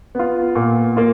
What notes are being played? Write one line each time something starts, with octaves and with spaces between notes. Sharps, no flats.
B3 F4
A#2
A#3 F4